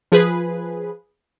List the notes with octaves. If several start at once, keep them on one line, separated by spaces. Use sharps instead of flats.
F3 G#4 B4